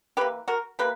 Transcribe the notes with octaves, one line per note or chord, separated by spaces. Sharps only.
E3 A#3 G4 B4
F#4 A#4
E3 A#3 G4 B4